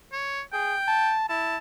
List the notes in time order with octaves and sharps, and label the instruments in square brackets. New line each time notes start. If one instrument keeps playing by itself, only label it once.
[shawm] C#5
[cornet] G#4 [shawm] G5
[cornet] A5
[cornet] E4 [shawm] A5